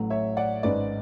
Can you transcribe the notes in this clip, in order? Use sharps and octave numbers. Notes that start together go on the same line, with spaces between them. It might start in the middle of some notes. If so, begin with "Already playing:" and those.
Already playing: A1 A2 F#3 A3
C#5 E5
D5 F#5
G#1 G#2 G#3 C#4 B4 D5